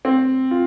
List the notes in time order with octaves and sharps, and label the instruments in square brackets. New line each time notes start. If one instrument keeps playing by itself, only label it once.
[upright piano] C4
F4